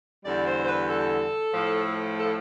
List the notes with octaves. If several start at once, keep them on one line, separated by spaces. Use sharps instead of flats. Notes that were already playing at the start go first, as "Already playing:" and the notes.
E2 D3 G3 D5
C5
C5
B4
A4
A2 F3 A3
A4